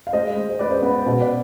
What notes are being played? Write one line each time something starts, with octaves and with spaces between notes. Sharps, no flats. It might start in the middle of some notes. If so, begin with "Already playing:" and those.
F5
G#3 C5 D#5
G#3
C5
G#3 B4 D5
C5
B3 B4
B4
B2 C5
B4 D5